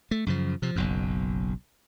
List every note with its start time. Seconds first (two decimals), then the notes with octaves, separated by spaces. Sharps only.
0.11 A3
0.26 F#2 C#3 F3
0.62 C3 F3
0.76 F#1 B1 F#2